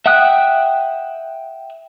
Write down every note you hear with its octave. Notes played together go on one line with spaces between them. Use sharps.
E5 F#5 G5 D#6 F#6